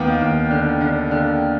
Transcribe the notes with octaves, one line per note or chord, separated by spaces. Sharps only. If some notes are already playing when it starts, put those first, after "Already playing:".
Already playing: D#2 B3 F5 G5
D#2
D3
D3
D3